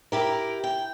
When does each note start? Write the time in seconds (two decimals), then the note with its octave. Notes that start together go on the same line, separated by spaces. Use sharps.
0.12 E4 G4 A#4
0.64 G5